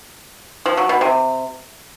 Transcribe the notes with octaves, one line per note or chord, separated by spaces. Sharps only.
F3
F#3
B2
C3